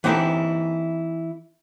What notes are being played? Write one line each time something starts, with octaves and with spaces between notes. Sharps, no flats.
E3 C4 D#4 E4 G4 A4